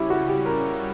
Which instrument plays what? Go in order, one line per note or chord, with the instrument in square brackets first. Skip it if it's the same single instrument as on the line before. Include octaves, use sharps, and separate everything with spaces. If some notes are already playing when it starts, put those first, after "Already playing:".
Already playing: [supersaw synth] C#3 G3 C#4 [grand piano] E4 G4
[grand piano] F#4
G4
A#4